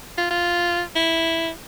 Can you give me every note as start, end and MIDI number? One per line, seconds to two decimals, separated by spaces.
0.18 0.29 65
0.30 0.82 65
0.96 1.50 64